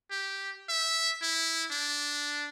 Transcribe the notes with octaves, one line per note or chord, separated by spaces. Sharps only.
G4
E5
E4
D4